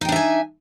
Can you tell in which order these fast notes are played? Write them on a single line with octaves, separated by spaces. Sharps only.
D#4 G5 D4 E5 G#5